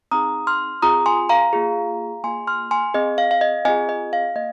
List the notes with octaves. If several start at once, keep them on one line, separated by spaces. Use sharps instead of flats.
C4 D#4 G#4 A#5 D#6
C6 F6
C4 F4 G#4 A#5 D#6
G#5 C6
F5 A#5
A#3 F4 G#4
A#3 F4 G#4 G#5 C6
C6 F6
G#5 C6
C4 G#4 D#5
F5
F5
D#5
C4 F4 G#4 D#5 G#5
D#5
F5
A#3 D#5